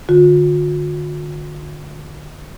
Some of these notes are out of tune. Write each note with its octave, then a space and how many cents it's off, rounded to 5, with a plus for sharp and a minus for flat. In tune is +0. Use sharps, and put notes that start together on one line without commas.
D3 +25 F4 +45